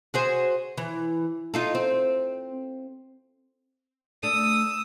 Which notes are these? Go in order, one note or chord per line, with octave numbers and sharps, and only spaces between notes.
F#4 G#4 C5
E3
D#4 F4 A4
C4
A3 D4 D#6 E6